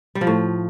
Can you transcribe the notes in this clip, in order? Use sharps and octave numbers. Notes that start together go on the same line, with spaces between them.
G3
F3
A2